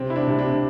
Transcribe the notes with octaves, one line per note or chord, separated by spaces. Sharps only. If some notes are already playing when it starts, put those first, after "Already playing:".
Already playing: C3 C4
E4
D4
C3
D4